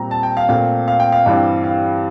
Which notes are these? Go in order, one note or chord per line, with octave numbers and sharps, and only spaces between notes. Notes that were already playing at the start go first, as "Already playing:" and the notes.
Already playing: A#2 G3 C4 A#5
A5
G5
F5
A#2 A3 C4 F5
F5
G5
F5
G2 E3 G3 C4
F5